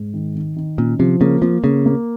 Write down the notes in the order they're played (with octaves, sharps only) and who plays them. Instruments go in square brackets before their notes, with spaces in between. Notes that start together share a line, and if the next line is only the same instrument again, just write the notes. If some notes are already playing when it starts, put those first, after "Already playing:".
Already playing: [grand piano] G#2
D#3
D#3
D#3
[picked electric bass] A#2 [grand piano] C#4
[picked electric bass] C3 [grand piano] F3
[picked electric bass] C#3 [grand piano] A#3
[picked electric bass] F3 [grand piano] A#3
[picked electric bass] C#3 [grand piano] A#3
[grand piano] A#3